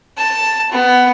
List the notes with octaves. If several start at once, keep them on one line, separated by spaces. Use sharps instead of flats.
A5
B3